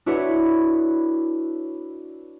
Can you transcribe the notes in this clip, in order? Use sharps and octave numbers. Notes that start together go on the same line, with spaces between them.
D4 E4 F#4 B4 C#5